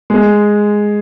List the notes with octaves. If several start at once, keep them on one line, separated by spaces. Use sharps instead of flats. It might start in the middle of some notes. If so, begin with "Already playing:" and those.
G#3